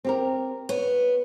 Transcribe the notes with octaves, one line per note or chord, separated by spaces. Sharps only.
C4 G4 A#4
B3 C#5